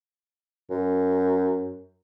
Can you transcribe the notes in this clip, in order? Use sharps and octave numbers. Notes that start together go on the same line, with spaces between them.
F#2